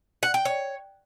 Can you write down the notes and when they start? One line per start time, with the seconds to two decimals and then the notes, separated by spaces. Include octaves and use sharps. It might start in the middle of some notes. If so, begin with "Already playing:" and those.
0.23 F#5
0.34 G5
0.45 C#5